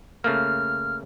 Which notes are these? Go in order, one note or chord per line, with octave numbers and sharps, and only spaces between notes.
C#3 A3 A#3 F6